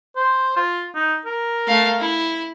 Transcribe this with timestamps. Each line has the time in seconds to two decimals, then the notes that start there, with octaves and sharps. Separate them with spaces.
0.16 C5
0.57 F4
0.95 D#4
1.26 A#4
1.68 A3 F5
2.00 E4